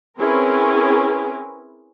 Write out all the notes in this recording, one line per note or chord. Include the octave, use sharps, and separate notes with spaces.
C4 C#4 E4 G#4 A#4 B4